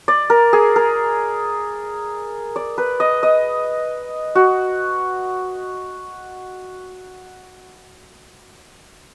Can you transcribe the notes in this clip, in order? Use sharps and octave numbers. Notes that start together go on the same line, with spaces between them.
D5
A#4
G#4
A#4
D5
B4
D#5
D#5
F#4